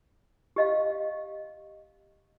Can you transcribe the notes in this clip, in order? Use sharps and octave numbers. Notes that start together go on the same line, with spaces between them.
G4 D#5 F5